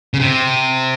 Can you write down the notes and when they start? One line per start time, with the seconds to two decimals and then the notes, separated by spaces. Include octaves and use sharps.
0.14 C#3
0.19 C3